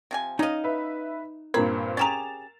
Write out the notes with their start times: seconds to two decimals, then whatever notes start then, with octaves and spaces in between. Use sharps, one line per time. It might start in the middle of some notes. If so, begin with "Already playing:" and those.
0.11 C3 F3 G#5
0.39 C#4 D#4 D#5 F5
0.64 B4 E5
1.54 G2 A#2 C4 A#4 C5 A#5 B5
1.97 C#4 G4 G#4 A#5 C#6 A6 E7 F7